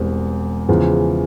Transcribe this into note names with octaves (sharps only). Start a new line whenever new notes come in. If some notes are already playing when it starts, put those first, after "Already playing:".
Already playing: E1 E2 G3 C4
E2 C#3 F3